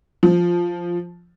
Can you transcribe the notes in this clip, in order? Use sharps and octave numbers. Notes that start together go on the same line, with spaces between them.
F3